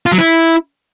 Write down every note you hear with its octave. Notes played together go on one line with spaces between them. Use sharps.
F4
F#3
E4